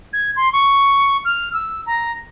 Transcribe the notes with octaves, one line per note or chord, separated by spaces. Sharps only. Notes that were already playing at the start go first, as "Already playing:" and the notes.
G#6
C6
C#6
F6
E6
A#5